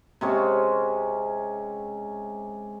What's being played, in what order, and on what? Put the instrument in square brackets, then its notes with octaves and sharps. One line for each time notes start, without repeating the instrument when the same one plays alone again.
[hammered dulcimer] C3 G#3 C#4